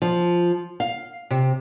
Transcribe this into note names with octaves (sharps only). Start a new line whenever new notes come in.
F3
F5
C3